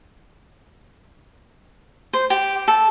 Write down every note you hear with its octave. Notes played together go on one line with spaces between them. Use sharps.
C5
G4
A4